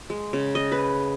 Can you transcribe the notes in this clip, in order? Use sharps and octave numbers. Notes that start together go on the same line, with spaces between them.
G#3
C#3
D#5
B4